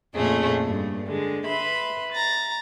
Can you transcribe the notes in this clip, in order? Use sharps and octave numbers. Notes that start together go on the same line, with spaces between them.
F2 A#2 C#3 A3 G#4
G2
D3 G#3
B4 E5 B5 C6
A#5 A6